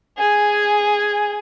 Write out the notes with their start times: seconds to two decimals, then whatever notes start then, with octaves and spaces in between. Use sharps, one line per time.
0.18 G#4 G#5